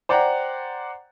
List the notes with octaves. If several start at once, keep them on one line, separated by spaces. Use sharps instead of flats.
C5 D5 F#5 G5 A#5